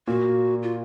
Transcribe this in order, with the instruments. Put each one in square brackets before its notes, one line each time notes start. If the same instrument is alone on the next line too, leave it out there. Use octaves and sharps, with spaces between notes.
[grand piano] A#2 A#3 [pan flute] F#4
[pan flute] F4